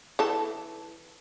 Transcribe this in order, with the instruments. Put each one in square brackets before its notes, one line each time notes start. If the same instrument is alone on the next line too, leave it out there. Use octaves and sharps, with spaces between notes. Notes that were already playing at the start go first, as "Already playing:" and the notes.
[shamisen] E3 A4 A5